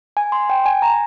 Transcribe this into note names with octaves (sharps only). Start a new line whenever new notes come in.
G#5
C6
G5
G#5
A#5